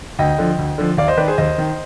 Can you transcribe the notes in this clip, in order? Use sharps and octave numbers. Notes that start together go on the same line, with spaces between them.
D2 D#5 G5
D3 F3
D2
D3 F3
D#2 D5 F5
C5 D#5
D#3 B4 D5
G#4 C5
D#2 C5 D#5
D#3